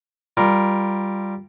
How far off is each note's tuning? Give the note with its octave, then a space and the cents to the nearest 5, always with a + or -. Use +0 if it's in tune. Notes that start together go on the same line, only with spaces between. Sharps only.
G3 +5 F4 +5 A#4 +5